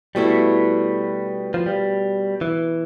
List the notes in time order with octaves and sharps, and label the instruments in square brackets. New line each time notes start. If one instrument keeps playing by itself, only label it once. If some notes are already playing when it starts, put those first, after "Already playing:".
[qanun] B2 A3 E4 [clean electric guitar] G3
[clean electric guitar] F3
G3
E3